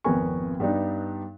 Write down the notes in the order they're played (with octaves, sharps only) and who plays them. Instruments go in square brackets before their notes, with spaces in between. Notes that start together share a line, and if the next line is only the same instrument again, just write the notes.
[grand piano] G#1 F2 B3 A#4 G#5 C#6
G2 G3 B3 D4 D#4